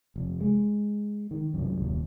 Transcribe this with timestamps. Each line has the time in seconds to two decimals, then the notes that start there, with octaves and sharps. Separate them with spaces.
0.16 F1
0.40 G#3
1.31 D#3
1.54 C2 F#2
1.82 D#1